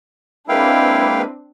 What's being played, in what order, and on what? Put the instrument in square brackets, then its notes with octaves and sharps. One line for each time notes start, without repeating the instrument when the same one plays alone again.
[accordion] G#3 A#3 B4 [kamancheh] C4 D4 [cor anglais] E4 [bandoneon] F5 G5